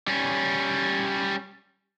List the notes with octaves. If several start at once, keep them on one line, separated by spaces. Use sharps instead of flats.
G3 C#4